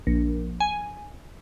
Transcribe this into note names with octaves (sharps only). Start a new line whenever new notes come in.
A#1
G#5